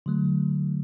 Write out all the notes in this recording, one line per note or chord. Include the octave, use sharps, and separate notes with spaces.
D3 F#3 A3